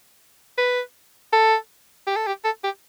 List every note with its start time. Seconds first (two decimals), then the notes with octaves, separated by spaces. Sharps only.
0.58 B4
1.33 A4
2.07 G4
2.17 A4
2.27 G4
2.45 A4
2.64 G4